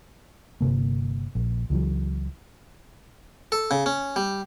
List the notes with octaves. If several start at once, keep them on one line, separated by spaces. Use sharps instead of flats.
G1 F#2 C3 A#3
A#1
C#2 E3 F#3
A4
C#3
C#4
G3